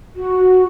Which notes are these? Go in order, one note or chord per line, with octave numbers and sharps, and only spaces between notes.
F#4